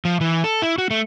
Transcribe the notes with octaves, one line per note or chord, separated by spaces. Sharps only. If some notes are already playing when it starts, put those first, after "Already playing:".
F3
E3
A4
E4
F#4
A3